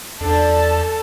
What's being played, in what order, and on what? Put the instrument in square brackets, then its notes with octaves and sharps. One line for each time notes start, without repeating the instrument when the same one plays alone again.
[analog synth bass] E2 [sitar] F3 D4 [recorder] A4 [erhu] A5